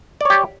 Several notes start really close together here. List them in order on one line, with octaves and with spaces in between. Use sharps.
D5 C#5 G4